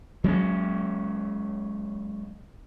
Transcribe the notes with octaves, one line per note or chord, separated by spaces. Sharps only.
F#3 G#3 A#3 C#4